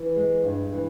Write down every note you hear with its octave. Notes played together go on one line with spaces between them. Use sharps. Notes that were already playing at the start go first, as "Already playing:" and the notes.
Already playing: E3
G#3
G2
E3